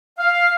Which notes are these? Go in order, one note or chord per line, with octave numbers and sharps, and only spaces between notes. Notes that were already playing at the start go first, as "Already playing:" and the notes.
F5